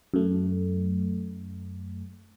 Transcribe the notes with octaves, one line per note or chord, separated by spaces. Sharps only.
F#2 A3